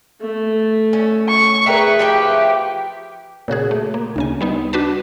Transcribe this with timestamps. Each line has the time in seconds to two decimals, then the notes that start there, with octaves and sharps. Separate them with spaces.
0.21 A3
0.93 C#4
1.28 C#6
1.66 G#4 B4 E5 G5 A#5
1.99 F3 G4 E5 G5
3.48 A#2 C#3 F#4 G#4
3.71 A3
3.94 A#3
4.16 D2 C#3 G#5
4.41 G3 B3 D#4
4.73 D4 F#4 B4 A5